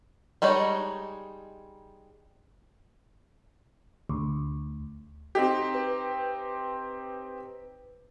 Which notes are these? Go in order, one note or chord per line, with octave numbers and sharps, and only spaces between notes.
G3 G#3 D#4 C#5
D2
C4 D#4 G4
B4